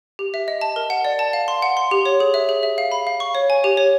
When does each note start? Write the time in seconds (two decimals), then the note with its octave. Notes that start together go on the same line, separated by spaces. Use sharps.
0.19 G4
0.34 E5
0.48 D#5
0.61 A5
0.76 A#4
0.90 F#5
1.05 D5
1.19 A5
1.33 F5
1.48 C6
1.62 F#5
1.77 C6
1.91 G4
2.06 C#5
2.20 G#4
2.34 E5
2.49 G#4
2.63 E5
2.78 F5
2.92 B5
3.07 F5
3.20 C#6
3.35 C#5
3.50 G#5
3.64 G4
3.77 C#5